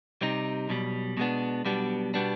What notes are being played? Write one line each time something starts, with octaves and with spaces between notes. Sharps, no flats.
C3 G3 C4 D#4
B1 B2 G3
B2 G#3 B3 D4
B1 B2 G3 B3 D4
B2 G3 B3 D4